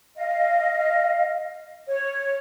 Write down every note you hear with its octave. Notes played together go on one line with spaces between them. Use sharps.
D#5 F5
C#5